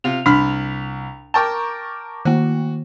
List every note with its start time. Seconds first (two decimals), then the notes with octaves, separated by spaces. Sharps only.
0.04 C3 F4 F7
0.26 C2 D4 B5 F6
1.34 A#4 G5 A5 A#5 C#6 D6
2.25 D#3 A#3 F#4